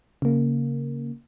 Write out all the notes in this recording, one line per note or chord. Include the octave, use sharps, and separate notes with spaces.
C#3 A#3